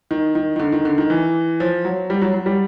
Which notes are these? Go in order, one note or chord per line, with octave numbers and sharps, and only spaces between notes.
D#3
D#3
D#3
D3
D#3
D3
D#3
E3
F3
F#3
G3
F#3
F#3
G3